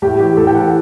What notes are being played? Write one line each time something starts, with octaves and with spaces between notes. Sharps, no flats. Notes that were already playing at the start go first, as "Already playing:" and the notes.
A2 G4
E3 G4
A2 A4
G5
E3 F#5